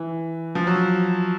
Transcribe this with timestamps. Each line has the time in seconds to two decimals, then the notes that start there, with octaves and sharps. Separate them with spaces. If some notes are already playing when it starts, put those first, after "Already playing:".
Already playing: E3
0.55 F3
0.67 F#3